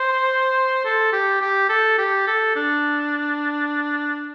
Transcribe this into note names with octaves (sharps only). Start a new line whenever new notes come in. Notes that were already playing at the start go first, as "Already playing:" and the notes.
Already playing: C5
A4
G4
G4
A4
G4
A4
D4